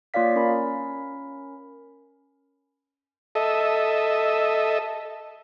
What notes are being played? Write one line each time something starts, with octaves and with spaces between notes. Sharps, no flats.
A#3 F4 C#5 D5 F5 B6
C#4 A#4 B5
A4 D#5 E5